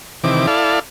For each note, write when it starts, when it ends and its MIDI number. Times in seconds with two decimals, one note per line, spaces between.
0.24 0.47 48
0.24 0.47 51
0.24 0.47 52
0.24 0.47 86
0.47 0.79 64
0.47 0.79 69
0.47 0.79 74
0.47 0.79 77